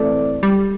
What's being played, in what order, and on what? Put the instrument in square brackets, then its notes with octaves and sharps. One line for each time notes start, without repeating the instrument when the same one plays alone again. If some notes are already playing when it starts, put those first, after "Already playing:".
Already playing: [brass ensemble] A2 E3 C4 A4 D5 [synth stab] A3
[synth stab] G3